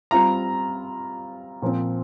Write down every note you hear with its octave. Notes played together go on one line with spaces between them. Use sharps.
G3 C4 F4 A#5
A#2 F3 C4